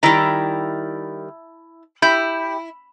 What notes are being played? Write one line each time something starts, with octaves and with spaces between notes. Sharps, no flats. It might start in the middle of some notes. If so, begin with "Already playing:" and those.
D#3 G3 E4 A5 A#5
E4 G4 B5 G6